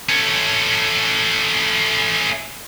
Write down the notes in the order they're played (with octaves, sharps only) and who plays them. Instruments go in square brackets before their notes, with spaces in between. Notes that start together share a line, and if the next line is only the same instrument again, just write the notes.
[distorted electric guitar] A3 C#4